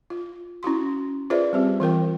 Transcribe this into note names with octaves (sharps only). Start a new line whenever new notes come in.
F4
C#4 E4 F#4 C6
F4 G#4 B4 C5 D5 E5
G3 C4 G4
E3 F4 A#4 G5